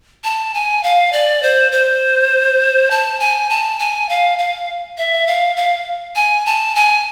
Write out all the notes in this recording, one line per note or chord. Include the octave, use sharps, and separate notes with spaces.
A5
G#5
F5
D5
C5
C5
A5
G#5
A5
G#5
F5
F5
E5
F5
F5
G#5
A5
G#5